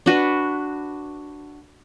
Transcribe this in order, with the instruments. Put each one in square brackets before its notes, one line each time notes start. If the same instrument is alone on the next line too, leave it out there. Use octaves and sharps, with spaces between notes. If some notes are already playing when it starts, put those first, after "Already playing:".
[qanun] D4 F#4 B4